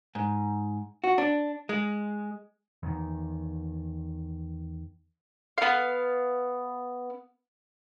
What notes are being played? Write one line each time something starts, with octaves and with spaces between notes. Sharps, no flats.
G#2
F#4
D4
G#3
E2 D#3
B3 F5